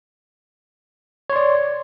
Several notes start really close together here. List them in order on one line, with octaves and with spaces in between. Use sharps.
C#5 C6 D5